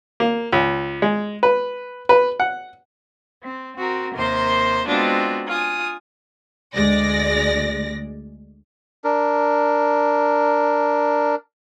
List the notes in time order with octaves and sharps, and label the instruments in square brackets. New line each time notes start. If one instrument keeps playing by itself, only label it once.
[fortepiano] A#3
C#2
G#3
B4
B4
F#5
[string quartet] C4
C4 F#4 A#4
D#2 C3 A#4 C5 D#5 C6
G#3 B3 C4 D4 F4 F#4
F4 G#5 D#6
[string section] D2 G#3 D5 A#6
[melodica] D4 A#4